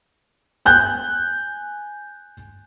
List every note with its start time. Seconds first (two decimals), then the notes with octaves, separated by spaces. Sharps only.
0.65 G#5 F#6 G6